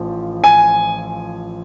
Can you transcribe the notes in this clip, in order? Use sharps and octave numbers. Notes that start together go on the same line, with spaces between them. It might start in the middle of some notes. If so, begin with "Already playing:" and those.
Already playing: A1 F3
G#5